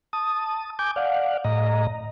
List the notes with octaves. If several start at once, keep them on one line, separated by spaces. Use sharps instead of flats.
A5 D#6
G#5 D6 G6
D5 F5 F#5
A2 D#5 A#5